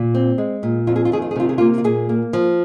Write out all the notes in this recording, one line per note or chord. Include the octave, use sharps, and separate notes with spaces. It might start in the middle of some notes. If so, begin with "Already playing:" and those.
Already playing: A#2
C4
G#3
A#2
F2 F4
G#4
F4
D#3 G#4
F4
G#4
C3 F4
G#4
A#3 F4
F4
A#2 G#4
A#3
F3